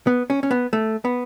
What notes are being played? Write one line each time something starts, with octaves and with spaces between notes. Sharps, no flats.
B3
C#4
C#4
B3
A3
B3